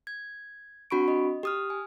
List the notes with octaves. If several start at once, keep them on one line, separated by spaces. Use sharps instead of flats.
G#6
C4 D4 F#4 B5 C#6 D7
D#5
G4 D#6 F6
G#5